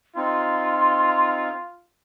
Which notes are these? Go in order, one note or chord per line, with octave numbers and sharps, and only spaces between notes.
C4 D#4 F4 C6